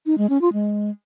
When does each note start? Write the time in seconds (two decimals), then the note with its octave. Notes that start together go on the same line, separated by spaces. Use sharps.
0.06 D#4
0.18 G#3
0.30 C#4
0.41 F4
0.53 G#3